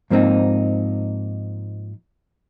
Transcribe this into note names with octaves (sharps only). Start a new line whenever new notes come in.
G#2 F3 A#3 C4 D#4